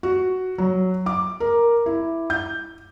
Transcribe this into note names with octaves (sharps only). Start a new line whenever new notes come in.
F#4
F#3
D6
A#4
E4
G6